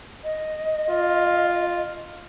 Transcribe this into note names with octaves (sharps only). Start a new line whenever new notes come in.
D#5
F4